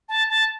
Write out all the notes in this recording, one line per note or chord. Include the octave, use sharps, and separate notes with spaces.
A5
A5